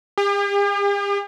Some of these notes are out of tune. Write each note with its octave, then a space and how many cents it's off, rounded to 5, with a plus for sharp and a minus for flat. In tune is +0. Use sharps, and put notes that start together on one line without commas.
G4 +45